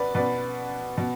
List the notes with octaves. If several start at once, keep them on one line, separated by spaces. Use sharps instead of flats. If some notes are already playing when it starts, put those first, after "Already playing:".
Already playing: B2 B4 D5
B2 B4 D5
B2